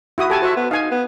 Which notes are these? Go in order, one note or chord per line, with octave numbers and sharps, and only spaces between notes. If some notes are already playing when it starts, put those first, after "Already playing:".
E4 F#4 D#6
G4 A4 G#5 A5
F#4 C5 E5
B3
D#4 F5 G#5
B3